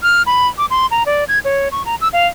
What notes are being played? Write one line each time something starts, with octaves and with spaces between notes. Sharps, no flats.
F6
B5
D6
C6
A#5
D5
G#6
C#5
C#6
A#5
E6
F5